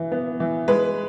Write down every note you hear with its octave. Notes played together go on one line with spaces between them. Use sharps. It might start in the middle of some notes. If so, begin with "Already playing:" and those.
Already playing: E3
B3
E3
G#3 B4